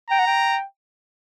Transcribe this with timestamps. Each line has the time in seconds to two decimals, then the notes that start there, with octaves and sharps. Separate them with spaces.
0.10 G5 A#5
0.19 F#5
0.27 G5